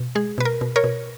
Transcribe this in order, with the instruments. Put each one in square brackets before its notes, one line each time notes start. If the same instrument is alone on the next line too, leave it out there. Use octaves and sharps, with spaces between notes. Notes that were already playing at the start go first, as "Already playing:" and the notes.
Already playing: [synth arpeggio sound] B2
G#3 G#4
B2 B4
A#4
B2
A#4 C#5
B2